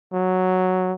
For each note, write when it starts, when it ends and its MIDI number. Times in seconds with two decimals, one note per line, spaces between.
0.13 0.92 54